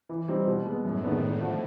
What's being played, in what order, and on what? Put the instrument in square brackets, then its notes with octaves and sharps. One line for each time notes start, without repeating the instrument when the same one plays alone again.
[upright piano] E3
G3 C4 D#4
B2
G#3 B3
[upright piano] F#2 [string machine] A2
[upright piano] D#3 G#3 B3 D4
D3
F3 A3 D4 F#4